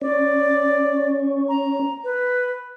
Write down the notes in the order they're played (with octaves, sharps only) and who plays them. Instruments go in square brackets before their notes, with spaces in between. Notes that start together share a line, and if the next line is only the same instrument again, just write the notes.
[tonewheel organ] C#4 [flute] D5
[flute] A#5
B4